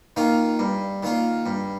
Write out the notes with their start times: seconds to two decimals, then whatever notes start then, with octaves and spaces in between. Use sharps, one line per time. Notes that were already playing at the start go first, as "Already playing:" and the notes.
0.16 D#3 A#3 F4
0.59 G2
1.03 D#3 A#3 F4
1.46 G2